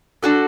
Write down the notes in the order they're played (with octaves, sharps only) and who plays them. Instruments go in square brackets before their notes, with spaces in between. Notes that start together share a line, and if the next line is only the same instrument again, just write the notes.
[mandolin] D4 F#4 A4